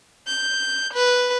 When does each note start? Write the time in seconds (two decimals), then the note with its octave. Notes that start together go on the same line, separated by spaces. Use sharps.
0.28 G6
0.94 B4